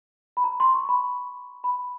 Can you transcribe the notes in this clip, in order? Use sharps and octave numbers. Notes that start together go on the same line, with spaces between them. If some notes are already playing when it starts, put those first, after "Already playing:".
B5
A#5
C6
C#6
B5
B5